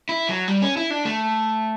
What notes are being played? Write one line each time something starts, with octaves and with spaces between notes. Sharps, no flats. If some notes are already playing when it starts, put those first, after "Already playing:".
E4
F#3
G3
C#4
E4
D4
A3